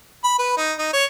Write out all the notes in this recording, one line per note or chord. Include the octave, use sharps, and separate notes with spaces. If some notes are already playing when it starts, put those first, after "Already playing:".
B5
B4
D#4
D#4
C#5